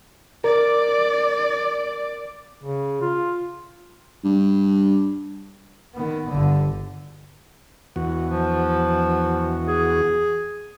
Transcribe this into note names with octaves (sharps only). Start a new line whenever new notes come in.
A#4 D5
C#3
F4
G2
D#3 B3
G1 D3
E2 F#4
F3
G#4